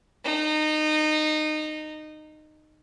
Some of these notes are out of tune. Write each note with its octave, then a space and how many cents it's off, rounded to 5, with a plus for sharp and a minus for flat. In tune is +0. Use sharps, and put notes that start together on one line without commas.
D#4 -20